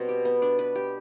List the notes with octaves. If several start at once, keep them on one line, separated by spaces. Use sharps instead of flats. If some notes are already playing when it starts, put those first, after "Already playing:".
Already playing: B2 G3 C4
G4
B3
D4
B4
G4